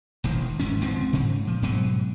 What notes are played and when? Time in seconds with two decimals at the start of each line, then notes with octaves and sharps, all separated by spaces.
0.24 E1 A1 D#3
0.59 G1 G#2 D3 C#4
0.81 C#2 G#2 F3 C4
1.13 G#2 C#3
1.45 A#2 F3
1.62 G#2 B2 F#3